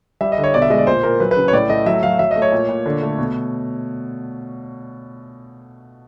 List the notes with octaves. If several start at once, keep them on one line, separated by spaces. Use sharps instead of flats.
G3 E5
D#5
D3
C#5
B2 D5
E5
G#3 D#5
D5
A#2 C5
A#2 A#4
F#3 B4
B4
C#3
C#5
A2 D5
A3 D#5
F#3 E5
F#3 F5
F#3 E5
A3 D#5
C#5
A#2
A#2
D3
A3
B2